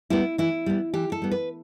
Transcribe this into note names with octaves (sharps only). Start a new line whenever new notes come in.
G3 B3 E4
E3 E4
G3 B3
E3 G4
A4
G3 B3
B4